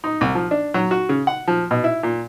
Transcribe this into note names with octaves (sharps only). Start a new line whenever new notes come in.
D#4
C2
F3
D4
F#3
F#4
C#3
F#5
F3
B2
E4
A#2